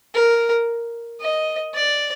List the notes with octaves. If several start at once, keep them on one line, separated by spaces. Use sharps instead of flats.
A#4
D#5
D5